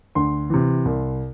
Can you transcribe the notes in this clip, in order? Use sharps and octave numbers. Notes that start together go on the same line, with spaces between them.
D2 C6
C3 E3
C2